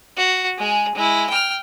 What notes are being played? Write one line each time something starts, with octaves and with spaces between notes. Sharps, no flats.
F#4
G#3 G#4
G#3 E4
G5 F6